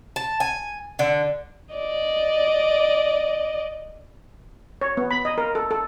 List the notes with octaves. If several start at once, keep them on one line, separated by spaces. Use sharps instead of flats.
A5
G#5
D3
D5 D#5
C#5
B3
B5
D#5
A#4
A4
A4